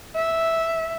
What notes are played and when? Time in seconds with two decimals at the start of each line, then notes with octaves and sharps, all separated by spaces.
0.15 E5